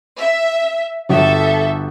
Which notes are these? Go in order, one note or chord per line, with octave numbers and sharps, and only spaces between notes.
E5
G1 F#4 A4 E5